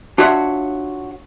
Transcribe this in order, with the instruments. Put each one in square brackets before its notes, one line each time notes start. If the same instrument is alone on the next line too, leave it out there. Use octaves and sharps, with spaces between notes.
[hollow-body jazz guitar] D4 F4 F#4 C#5 E5 F#5